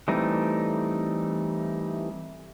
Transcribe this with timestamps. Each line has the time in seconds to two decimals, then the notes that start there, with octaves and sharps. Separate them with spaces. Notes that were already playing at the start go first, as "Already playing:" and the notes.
0.08 E3 G3 A3 C4 D#4